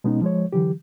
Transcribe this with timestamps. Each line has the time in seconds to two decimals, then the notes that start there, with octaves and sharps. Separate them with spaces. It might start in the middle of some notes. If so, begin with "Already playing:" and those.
0.04 B2 G#3 B3 C#4 D#4
0.21 F3 G#3 C#5
0.53 D3 E3 F#3 G4